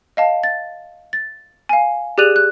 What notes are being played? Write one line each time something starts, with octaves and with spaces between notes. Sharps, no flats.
D#5 F5 A5
A6
A6
F5 G#5
G4 G#4 D5 F#6 D#7 F7
F#6